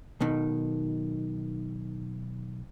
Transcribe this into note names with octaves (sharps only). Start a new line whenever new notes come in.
B1 B2 D#3